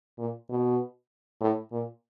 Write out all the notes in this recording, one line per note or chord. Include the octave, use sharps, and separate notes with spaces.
A#2
B2
A2
A#2